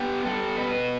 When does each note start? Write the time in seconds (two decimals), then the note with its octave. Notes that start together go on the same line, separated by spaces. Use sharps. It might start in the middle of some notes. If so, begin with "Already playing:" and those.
Already playing: B3 D4 G4
0.25 G3 A4
0.56 B2 B4